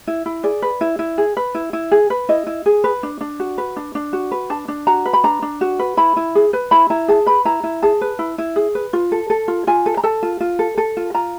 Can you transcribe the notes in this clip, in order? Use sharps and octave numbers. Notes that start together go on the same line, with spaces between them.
E4
E4
G#4 D5
B4
E4
E4
G#4
B4
E4
E4
G#4
B4
E4 D#5
E4
G#4
B4
D4
D4
F#4
B4
D4
D4
F#4
B4
D4 A5
D4
F#4 A#5
B4
B5
D4 A#5
D4
F#4
B4
E4 B5
E4
G#4
B4
E4 B5
E4 A#5
G#4 A5
B4 B5
E4 A#5
E4
G#4 A5
B4
E4
E4
G#4
B4
F4
A4
A4
F4
F4 G#5
A4
A#5
A4 A5
F4
F4
A4
A4
F4
F4 A#5